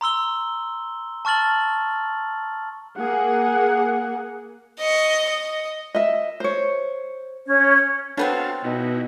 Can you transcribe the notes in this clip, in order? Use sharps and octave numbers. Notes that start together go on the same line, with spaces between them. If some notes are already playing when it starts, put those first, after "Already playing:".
A#5 C6 E6 G7
A5 C#6 F6 A6 F#7
A#3 G#4 F#5
D#5 C#6
D#5
D#5 E5
C5 C#5
C#4 C#5
A3 B3 C4 D4 F#4 C#5 F5 A5
B2 D#4 E4 F#4